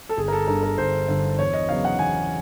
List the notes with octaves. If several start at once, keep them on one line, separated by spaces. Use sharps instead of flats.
A4
G1 G#4
A#4
A4
G2 D3 A#4
A#4
G1 C5
G2 D3
E2 C#5
D#5
C#3 F#3 B3 F5
F#5
E2 G#5